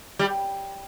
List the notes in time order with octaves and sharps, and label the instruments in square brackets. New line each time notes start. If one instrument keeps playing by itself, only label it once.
[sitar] G3